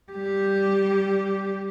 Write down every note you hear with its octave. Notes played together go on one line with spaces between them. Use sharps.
G3 G4